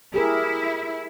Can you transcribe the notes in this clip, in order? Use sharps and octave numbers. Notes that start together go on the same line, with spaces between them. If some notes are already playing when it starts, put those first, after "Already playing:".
E4 G4 G#4 A#4